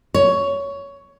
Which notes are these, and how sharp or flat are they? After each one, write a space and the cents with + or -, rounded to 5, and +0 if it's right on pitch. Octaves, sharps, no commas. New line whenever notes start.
C#5 +15